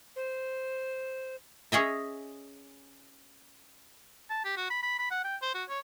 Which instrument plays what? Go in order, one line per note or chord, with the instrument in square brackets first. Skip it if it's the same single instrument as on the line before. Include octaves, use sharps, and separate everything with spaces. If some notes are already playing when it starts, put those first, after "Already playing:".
[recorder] C5
[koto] C#4 G#4 D#5 E5
[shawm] A5
G4
F#4
B5
B5
B5
F#5
G5
C5
F#4
C#5